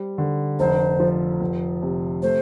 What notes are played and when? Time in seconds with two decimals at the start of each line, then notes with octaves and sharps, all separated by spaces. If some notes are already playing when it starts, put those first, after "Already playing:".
Already playing: G3 C4
0.18 D3
0.59 F1 C5
1.00 F3
1.41 F1
1.82 C3
2.23 A3 C5